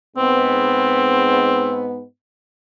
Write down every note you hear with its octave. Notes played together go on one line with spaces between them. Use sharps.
G#2 B3 C4